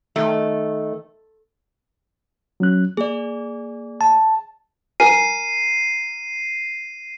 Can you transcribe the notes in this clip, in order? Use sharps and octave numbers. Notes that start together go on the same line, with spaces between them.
D#3 A3
F#3 C#4 F#6
A#3 G#4 D5
A5
A#4 G#5 C7 D#7